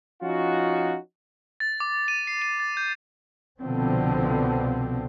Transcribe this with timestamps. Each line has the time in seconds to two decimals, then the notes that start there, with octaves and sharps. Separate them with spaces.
0.23 F3 C#4 D#4 F4 F#4
1.60 A6
1.80 D6
2.08 D#7
2.27 C7
2.42 D#7
2.60 A6
2.77 G6
3.60 C2 B2 D3 F3 B3 C4